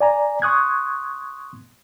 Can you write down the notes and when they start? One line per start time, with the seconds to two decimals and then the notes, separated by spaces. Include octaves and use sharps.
0.01 D5 G#5 A#5
0.42 C6 C#6 D#6 F#6 G#6